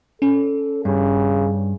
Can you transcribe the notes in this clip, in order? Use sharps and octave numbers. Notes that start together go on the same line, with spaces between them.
C#4 A4
G2 C#3